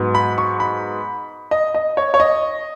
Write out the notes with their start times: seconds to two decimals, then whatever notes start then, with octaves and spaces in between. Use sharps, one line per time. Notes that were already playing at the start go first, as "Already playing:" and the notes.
Already playing: G#2 F#3 B3
0.15 B5
0.38 C#6
0.60 B5
1.51 D#5
1.75 D#5
1.97 C#5
2.14 C#5
2.20 D#5